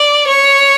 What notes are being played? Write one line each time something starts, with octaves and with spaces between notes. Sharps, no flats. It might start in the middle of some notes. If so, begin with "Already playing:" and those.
Already playing: D5
C#5